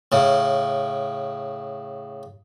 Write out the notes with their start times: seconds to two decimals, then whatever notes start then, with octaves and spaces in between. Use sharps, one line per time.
0.12 A2 C#3